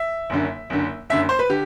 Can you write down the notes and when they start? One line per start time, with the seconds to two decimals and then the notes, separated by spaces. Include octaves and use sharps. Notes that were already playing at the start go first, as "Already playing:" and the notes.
Already playing: E5
0.30 F#1 F#2 D3
0.70 F#1 F#2 D3
1.10 F#1 F#2 D3 E5
1.29 C5
1.39 B4
1.49 D3 G4